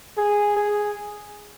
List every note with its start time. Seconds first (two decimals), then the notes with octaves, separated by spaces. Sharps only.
0.17 G#4
0.57 G#4